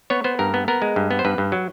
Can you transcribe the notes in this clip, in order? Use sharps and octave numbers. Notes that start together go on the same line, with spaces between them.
B3 C#5
B3 C5
G2 A#4
B3
B3 A#4
G#3
G2
B3
C5
G2 B4
G2
F#3